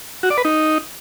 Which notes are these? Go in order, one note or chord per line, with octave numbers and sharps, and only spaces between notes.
F#4
D5
B4
D#4